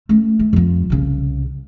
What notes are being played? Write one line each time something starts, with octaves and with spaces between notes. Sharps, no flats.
A3 C#4
A3
F2 F3
C2 C#3